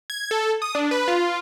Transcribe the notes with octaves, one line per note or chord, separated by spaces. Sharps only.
G#6
A4
D#6
D4
B4
F4